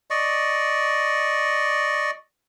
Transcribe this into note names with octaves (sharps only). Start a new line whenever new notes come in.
D5 D#5 C#6